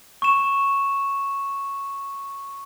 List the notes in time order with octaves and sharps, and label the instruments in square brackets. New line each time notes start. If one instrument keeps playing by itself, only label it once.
[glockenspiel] C#6 E7